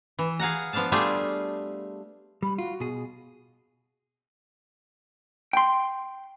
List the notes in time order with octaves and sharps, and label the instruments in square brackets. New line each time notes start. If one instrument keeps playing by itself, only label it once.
[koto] E3
G#4 F5 F#5 A#5
F3 B3 D4 F5 A5
G3 A3 D4 F4 G4 G#4
[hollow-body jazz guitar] G3 [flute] B5
[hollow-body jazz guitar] F4 [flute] F#4
[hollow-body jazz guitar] B2 G#4
G5 C6